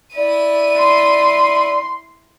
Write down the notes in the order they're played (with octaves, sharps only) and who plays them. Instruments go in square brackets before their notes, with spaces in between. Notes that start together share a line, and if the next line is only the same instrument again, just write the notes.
[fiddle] E4 [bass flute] D5 [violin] D#7
[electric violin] C6